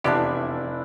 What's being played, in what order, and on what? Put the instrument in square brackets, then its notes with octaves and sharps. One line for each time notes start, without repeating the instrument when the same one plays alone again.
[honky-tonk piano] F1 [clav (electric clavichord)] E2 B2 G4 [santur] D4 E4 D5